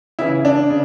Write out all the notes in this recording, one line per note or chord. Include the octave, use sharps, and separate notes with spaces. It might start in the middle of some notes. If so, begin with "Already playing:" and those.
C#3 E3 E4
D4
C#3